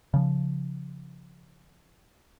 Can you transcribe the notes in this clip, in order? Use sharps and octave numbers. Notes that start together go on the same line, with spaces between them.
C#3 F3